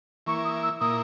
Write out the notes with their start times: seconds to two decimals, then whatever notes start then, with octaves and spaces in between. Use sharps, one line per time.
0.26 E3 A#3 E4 C#6
0.45 D#6
0.63 E6
0.80 A#2 A#3 E4 D#6